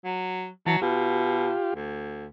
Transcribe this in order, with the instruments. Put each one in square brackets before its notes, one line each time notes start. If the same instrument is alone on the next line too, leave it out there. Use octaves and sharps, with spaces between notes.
[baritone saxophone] F#3
[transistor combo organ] E3 A5 [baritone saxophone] F#3
[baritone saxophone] B2 [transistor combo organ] F4 G4
[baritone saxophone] D2